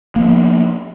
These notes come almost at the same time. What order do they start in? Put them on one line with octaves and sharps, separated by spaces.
A#3 F3 B3